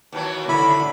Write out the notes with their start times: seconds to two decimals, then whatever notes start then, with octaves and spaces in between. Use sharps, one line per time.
0.12 D#2 E3 F#3
0.49 D3 E4 B5